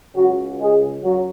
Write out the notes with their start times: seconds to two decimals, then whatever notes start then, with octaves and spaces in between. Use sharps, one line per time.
0.15 C#2 C#3 F#3 F#4
0.59 G#3 G#4
1.01 F#2 F#3 F#4